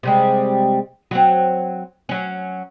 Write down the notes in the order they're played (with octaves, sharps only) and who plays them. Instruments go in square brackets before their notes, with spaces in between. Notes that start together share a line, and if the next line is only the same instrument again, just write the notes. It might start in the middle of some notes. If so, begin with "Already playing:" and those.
[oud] C3 G3 G#3
F#3 C4
F#3 C#4